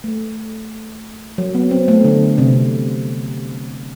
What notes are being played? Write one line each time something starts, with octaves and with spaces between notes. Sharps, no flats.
A3
F#3
B3
C4
A3
D3
C3